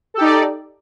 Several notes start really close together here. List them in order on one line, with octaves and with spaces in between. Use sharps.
A4 G4 D#4 D5